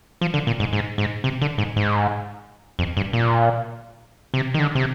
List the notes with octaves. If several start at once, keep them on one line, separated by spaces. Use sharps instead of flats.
F3
D3
A#2
G#2
G#2
G#2
C3
D3
G#2
G#2
F2
G2
A#2
C3
D#3
D3
C3